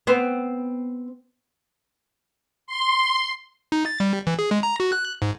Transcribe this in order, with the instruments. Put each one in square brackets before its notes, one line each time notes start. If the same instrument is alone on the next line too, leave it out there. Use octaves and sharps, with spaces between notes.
[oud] B3 C4
[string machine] C6
[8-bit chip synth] D#4
A6
G3
E3
G#4
G#3
A#5
F#4
F#6
G#2